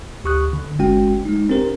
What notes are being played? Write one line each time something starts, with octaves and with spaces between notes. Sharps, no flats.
D2 G4 C#6 D#6 F#6
D3
G1 G#3 C#4 F#4 G5
G#3 D#4
C4 D4 G4 A#4 C5